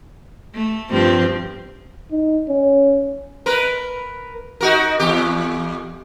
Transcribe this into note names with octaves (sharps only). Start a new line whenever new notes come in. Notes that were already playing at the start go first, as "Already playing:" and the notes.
A3
G2 F3 C4
D#4
C#4
A#4 B4
D#4 F#4 A#4
E2 G4